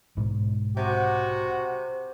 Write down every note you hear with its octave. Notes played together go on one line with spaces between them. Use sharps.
B1 G#2 G#3
C3 F#4